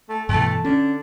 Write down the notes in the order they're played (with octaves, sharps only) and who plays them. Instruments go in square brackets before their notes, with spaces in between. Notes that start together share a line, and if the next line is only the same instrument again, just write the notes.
[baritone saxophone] A3
[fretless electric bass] G2 B2 E3 [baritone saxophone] A3
[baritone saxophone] D3 [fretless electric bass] C#4